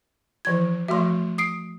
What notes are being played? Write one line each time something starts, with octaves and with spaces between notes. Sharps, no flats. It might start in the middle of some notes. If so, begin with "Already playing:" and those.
E3 F3 E4 G#6
F3 A3 F#4 E5 C6
D#6 C7 D7